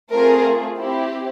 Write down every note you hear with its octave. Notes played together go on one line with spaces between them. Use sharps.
A3 C4 F4 G#4 A#4
C4 E4 G4